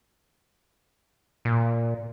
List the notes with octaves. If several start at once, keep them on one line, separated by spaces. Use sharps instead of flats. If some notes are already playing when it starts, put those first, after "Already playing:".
A#2